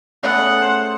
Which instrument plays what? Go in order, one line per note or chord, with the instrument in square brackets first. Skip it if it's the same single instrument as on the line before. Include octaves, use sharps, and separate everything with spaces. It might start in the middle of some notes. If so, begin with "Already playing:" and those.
[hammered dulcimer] C#3 A3 B3 [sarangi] F#5
[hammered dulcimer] C5